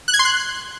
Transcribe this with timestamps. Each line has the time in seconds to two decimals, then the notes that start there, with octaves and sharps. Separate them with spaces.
0.08 F#6
0.14 G#6
0.19 C6
0.25 F#6